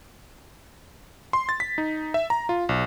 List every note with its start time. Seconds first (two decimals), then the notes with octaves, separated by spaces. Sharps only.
1.33 C6
1.49 A6
1.60 B6
1.78 D#4
2.14 E5
2.30 A#5
2.49 F4
2.69 B1